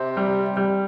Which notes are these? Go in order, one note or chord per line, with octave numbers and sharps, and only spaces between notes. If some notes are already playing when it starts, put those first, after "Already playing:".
Already playing: C3 C4
G3
G3